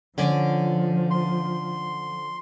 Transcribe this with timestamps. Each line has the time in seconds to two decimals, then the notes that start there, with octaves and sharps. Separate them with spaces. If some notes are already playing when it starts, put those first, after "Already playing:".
0.18 D3 F3 C#4 D5
1.11 C6